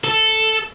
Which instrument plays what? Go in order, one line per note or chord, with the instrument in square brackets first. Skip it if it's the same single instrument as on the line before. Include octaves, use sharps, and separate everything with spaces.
[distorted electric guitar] A4